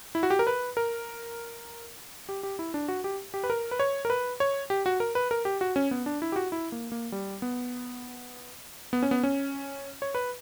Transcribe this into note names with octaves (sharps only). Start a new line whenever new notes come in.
E4
F#4
G4
A#4
B4
A#4
G4
G4
E4
D4
F#4
G4
G4
B4
A#4
B4
C#5
A#4
B4
C#5
G4
F#4
A#4
B4
A#4
G4
F#4
C#4
B3
D4
E4
G4
F#4
E4
A#3
A#3
G3
B3
B3
C#4
B3
C#4
C#5
B4